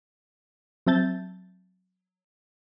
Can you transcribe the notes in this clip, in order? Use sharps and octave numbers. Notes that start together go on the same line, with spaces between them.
F#3 C4 E5 A5 G6 A6